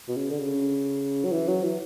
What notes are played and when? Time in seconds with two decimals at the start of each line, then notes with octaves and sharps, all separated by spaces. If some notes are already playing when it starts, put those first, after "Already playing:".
0.08 B2
0.16 C#3
0.30 D3
0.39 C#3
1.24 F#3
1.32 E3
1.48 F#3
1.63 E3